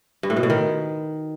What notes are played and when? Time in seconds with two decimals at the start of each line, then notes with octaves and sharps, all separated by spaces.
0.23 G2
0.30 A2
0.36 B2
0.43 A2
0.50 D#3